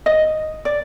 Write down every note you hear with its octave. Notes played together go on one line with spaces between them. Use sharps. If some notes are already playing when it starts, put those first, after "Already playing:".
D#5
D5